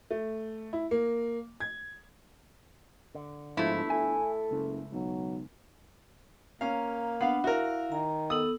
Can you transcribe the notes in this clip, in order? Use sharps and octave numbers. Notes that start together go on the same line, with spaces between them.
A3
E4
A#3
G#6
D3
G1 G#2 F3 G#3 A3 E4
A4 G#5
F#1 C#2
B1 F#3
A#3 C#4 F5 A#5
B3 D4 F5 F#5 B5
E4 F#4 A#4 E5 F5
D#3 A#5
B3 A4 D#6 E6 F#7